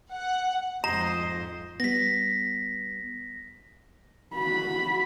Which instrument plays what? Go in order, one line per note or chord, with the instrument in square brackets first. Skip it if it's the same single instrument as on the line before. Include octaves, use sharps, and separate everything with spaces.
[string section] F#5
[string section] F2 G#2 [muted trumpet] C5 [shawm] D#5 [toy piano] A#5
[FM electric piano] G3 B3 [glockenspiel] A#6 B6
[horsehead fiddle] F#4 B5